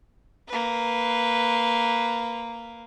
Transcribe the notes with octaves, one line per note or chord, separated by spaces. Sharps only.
A#3 B4